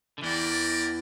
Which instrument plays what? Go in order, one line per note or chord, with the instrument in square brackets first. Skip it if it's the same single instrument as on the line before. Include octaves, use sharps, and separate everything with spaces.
[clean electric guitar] D3
[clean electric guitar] E2 E3 [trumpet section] E4 A#4 D5 G5